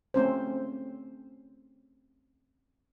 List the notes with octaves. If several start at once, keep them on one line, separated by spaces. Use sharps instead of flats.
A3 C4 C#4 C5